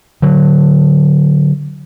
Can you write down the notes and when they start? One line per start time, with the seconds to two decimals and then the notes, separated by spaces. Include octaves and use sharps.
0.22 D3 F#3